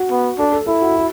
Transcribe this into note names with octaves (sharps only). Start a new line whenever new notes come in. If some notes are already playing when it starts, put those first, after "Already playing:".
Already playing: F#4
B3
D4 A4
A4
E4 A4
F#4
F#4